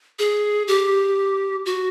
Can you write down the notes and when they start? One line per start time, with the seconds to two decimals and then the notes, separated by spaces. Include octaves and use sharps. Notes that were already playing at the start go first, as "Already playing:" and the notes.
0.19 G#4
0.68 G4
1.66 F#4